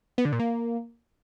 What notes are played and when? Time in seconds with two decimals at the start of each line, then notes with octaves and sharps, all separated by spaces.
0.18 B3
0.25 D3
0.32 A#2
0.40 A#3